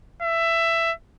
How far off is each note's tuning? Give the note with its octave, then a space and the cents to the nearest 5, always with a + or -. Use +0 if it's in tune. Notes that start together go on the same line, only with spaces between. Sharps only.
E5 +15